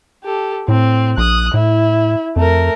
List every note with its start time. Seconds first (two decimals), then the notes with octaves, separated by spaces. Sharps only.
0.24 G4 A4
0.68 A2 C4
1.18 A#1 D#6 F#6
1.54 A2 E4
2.36 F2 A3 A#4